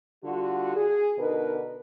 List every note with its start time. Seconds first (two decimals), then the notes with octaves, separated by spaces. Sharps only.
0.24 D3 G3 F4 F#4
0.76 G#4
1.18 B2 D3 D#4 A#4 B4